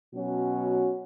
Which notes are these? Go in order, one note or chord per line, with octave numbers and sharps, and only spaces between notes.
B2 F#3 C#4 F#4